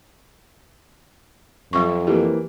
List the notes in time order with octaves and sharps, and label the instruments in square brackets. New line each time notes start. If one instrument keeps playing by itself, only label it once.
[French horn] F2 [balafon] F#3 C#6
[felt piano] E3 A#3 [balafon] G4